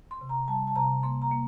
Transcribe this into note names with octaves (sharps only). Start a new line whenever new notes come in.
C6
C3
A#5
G3 A5
A5
C3 A#5
A#3 C6
A#5
A#3